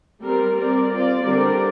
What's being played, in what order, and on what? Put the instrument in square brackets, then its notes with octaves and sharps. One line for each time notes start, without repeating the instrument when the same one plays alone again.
[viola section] G3 C4 A#4
C4 A#4 D5
C4 F4 D5
D3 G3 C4 A#4 D5